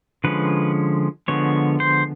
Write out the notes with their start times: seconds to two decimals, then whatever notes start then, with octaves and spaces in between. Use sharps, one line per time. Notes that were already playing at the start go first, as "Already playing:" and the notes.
0.24 D3 F3 G#3 C#4 B4
1.28 D3 F3 G#3 B3 C#5
1.80 C5